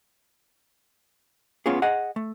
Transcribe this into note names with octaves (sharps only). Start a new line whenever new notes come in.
B3 C#4 F4 G#4
G#4 D#5 F#5
A3